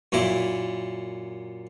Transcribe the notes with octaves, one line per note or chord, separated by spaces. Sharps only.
F#2 A#2 E4